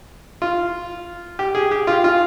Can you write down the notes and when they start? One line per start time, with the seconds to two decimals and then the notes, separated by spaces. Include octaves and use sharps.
0.42 F4
1.39 G4
1.55 G#4
1.71 G4
1.87 F4
2.04 F4